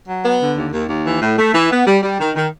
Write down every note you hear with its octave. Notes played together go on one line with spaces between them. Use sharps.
F#3
B3
D3
D#2
D#2
D#2
E3
A2
A3
E3
B3
G3
G3
D#3
D#3